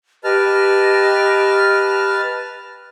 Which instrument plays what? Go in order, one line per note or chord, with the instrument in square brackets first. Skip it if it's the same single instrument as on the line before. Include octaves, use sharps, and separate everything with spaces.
[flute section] G4 D#5 [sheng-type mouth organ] B4 A5 F6